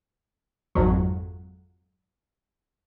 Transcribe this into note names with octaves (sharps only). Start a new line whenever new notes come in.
G#1 F2 F#3